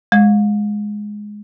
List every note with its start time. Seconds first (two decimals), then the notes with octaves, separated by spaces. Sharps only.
0.12 G#3